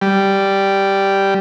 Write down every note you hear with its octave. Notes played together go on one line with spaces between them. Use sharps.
G3